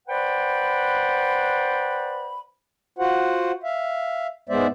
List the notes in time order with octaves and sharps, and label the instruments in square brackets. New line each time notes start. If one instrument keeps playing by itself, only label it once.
[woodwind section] B4 C5 D5 F#5 G5 B5
[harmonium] F4 F#4 C5 F#5
E5 F5
G#2 G#3 B3 C5 D5 E5